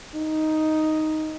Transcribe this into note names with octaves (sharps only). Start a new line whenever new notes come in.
D#4